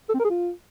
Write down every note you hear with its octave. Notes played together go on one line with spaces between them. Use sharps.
A4
C4
A#4
G#4
F4